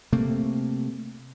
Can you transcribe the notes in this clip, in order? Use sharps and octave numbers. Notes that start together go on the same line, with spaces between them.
C3 A3 A#3